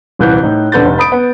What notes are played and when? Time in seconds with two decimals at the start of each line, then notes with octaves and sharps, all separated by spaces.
0.19 D#1 C2 E3 F#6 G6
0.43 A2 D#4
0.72 D#1 D3 B4 G6 A6
0.85 F1
0.98 B5 D#6 D7
1.12 B3